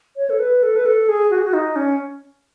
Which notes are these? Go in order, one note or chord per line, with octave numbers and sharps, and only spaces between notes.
C#5
A4
B4
A4
B4
A4
G#4
F#4
G#4
F#4
D#4
C#4